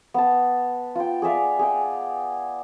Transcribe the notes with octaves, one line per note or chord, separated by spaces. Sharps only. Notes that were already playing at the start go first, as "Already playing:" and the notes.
B3 A5
F4 G5
G#4 D5 E5 F5
G#4 F5 G5